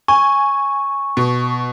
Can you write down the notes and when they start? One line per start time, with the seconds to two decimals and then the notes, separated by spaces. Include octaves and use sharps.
0.08 G#5 C#6
1.17 B2